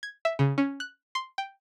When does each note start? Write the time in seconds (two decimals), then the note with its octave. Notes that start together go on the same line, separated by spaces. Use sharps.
0.03 G#6
0.25 E5
0.39 C#3
0.58 C#4
0.80 F#6
1.15 C6
1.38 G5